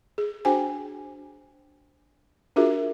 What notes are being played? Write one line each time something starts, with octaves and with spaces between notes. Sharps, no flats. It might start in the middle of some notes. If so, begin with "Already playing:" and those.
G#4
D4 F#4 G#4 C5 G5 G#5
D4 F4 F#4 G#4 A#4 E5